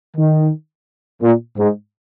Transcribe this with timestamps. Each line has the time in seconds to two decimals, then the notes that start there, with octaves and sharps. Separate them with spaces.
0.17 D#3
1.22 A#2
1.57 G#2